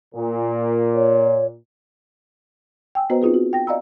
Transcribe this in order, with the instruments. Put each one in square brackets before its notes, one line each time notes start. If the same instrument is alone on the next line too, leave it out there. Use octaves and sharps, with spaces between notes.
[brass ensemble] A#2
[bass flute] C#5
[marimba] G5 G#5 E6
B3 F#4 B4 C5 D#5 A#5
C4 D#4 F4 G#4 B4
F#4
G5 A#6
D5 D#5 F5 A#5 B5 E6